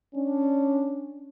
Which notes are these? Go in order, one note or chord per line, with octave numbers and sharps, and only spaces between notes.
C#4 D4